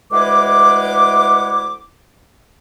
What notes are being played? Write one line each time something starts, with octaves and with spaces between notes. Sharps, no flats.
D2 E3 G#3 E4 F#5 D6